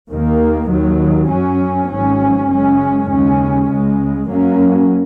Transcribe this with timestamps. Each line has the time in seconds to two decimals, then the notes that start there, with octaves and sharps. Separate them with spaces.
0.09 D#2 D#3 A#3
0.68 D#2 D#3 F#3
1.29 F#2 F#3 C#4
1.89 G#1 G#2 F#3 C#4
2.48 F#1 F#2 C#3 G#3 C#4
3.09 D#2 C#3 G#3 C#4
3.68 C#2 C#3 G#3
4.28 F#2 F#3 A#3 C#4